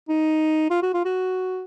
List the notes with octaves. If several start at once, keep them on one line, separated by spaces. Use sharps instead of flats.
D#4
F4
F#4
F4
F#4